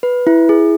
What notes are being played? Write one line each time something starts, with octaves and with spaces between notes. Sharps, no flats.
B4
E4
G#4